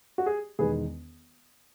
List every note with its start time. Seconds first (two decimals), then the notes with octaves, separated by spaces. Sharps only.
0.18 F#4
0.26 G#4
0.59 E1 E2 D#3 G#3 G#4 B4